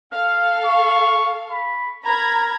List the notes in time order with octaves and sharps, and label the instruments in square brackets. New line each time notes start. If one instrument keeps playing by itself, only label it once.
[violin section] A4 F5 [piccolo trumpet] F6
[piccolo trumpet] C#6
B5
[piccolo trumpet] A#4 [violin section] A#5 B5 G#6